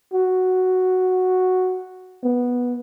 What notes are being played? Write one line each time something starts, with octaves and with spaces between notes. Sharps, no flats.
F#4
B3